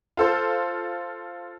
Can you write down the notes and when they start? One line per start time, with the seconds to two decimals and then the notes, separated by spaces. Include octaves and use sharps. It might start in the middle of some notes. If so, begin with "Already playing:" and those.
0.17 F4 A4 C5